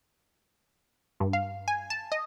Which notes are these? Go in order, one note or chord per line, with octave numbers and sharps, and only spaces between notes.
G2
F5
G#5
A5
D#5